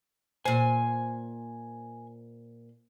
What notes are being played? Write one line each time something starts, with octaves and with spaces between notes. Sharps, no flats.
A#2 C5 G#5